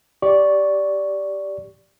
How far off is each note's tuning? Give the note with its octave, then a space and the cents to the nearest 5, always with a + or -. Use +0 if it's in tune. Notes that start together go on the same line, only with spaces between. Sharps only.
G4 +0 D5 -10 C#6 +0